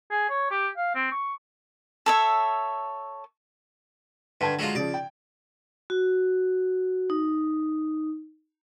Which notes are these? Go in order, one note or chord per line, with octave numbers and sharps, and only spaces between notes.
G#4
C#5
G4
F5
C4
C#6
A4 C#5 E5
G2 D3 A5 G#6
F#3 G#3 F4
C#3 F3 D5
G5
F#4
D#4